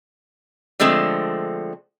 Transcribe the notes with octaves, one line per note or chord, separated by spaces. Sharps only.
D3 F3 G#3 A3 C4